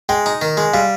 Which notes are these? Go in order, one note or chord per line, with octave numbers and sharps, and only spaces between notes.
G#3 G5
D#4
D#3
G#3
G3 F5